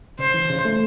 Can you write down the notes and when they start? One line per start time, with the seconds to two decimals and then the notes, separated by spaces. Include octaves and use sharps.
0.19 C#3 C5
0.34 E3
0.50 C#3
0.65 A3